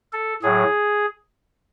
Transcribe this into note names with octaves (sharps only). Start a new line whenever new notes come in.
A4
A2 F#3 G#4